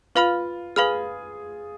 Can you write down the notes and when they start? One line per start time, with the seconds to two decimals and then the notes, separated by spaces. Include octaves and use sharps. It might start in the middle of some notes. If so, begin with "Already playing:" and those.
0.15 F4 B4 F5 B5 F6
0.76 G#4 B4 F5 B5 F6